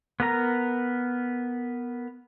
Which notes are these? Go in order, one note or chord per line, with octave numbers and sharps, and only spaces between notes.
B3 A#4 A#5